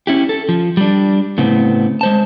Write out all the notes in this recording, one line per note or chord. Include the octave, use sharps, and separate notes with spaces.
C#4 E4 G4
A4
F3
G3 D4
A2 C#3 B3 C4
G#3 C5 A5